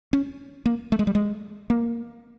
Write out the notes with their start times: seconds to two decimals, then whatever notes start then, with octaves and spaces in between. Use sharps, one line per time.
0.13 C#4
0.66 A#3
0.92 A3
0.99 G#3
1.07 G3
1.15 G#3
1.70 A#3